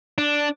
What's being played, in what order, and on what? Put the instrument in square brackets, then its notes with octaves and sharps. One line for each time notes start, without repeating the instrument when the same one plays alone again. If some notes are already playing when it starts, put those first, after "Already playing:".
[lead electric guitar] D4